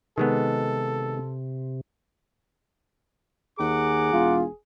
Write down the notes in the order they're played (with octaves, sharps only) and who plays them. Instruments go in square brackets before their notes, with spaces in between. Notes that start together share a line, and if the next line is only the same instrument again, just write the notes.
[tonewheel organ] C3 [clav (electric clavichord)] D#3 G#3 B3 [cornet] A4
[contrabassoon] D#2 [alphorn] G#4 [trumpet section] F#5 A#5 D6
[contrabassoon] E1 [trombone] F4